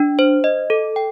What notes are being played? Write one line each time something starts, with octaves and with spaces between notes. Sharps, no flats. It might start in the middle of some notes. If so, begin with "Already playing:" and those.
Already playing: D4
C5
D#5
A4
G5